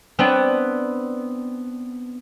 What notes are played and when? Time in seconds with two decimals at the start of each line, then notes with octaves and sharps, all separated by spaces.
0.19 B3 C4 D4